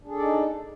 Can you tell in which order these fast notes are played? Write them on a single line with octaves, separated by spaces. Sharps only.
D4 G#4 A4 D5 D#4